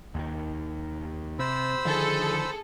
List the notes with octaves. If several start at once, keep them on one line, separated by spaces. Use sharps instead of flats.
D#2 D#3
C3 C5 B5 E6
D3 D#3 F3 G#4 A4